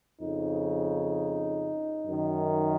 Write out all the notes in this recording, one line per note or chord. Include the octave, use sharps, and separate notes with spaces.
F2 C#3 D#4
F#2 D#3